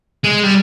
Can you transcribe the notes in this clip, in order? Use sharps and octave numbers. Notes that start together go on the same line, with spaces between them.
G#3
G3